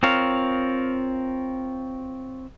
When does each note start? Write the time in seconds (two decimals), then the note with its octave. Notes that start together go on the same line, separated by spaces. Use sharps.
0.03 C4 F4 A#4 C#5 F5